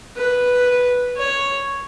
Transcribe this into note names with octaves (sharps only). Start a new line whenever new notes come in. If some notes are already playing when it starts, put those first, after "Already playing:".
B4
C#5